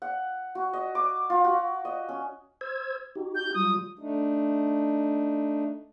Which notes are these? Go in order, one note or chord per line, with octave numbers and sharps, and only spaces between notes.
F#5
F#4
D#5
D6
F4
F#4
D#5
C#4
C5 E6 G#6
D#4 F#4 G4
G6
F#3 G3 F4 D#6
A3 D4 D#4